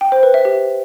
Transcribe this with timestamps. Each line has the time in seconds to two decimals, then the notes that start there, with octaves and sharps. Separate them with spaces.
0.01 G5
0.12 C5
0.23 B4
0.34 E5
0.45 G4